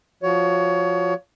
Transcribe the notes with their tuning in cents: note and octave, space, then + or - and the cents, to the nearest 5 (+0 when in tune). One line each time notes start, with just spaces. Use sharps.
F3 +0 F#4 +0 C#5 +20